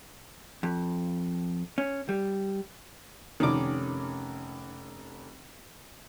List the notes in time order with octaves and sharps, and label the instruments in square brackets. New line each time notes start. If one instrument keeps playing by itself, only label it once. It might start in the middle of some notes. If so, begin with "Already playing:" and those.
[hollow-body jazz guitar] F2
C#4
G3
[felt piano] F1 C#4 [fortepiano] D#3 D6